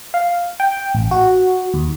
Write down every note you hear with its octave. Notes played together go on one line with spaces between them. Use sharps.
F5
G5
A1
F#4
D#2